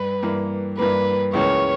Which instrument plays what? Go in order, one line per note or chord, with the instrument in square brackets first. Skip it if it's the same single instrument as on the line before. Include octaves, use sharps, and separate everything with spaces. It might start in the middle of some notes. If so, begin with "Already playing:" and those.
Already playing: [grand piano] G2 [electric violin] B4
[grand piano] G2 E3 A#3
[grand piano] G2 E3 A#3 [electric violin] B4
[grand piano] C#2 C#3 E3 A#3 C#4 [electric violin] C#5